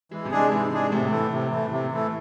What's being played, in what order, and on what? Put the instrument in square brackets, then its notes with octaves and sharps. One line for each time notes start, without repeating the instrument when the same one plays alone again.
[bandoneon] E3 [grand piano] G#3
[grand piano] C3
[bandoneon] G#3 D4 G#4
[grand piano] G#2 [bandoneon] E3
[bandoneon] G#3 D4 G#4
[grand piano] A2 [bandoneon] C3
[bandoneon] E3 A3
C3
E3 A3
C3
E3 A3